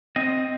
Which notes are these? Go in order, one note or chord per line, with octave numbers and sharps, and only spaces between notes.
C4 D#5